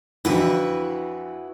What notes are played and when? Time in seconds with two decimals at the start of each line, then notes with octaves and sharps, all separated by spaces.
0.25 F2 D3 E3 E4 F#4 B4